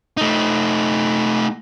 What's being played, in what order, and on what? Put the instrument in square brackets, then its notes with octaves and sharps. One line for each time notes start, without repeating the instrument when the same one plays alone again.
[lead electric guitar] A3 D#4